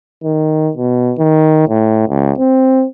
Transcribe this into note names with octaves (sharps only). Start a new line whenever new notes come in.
D#3
B2
D#3
A2
C#2
C4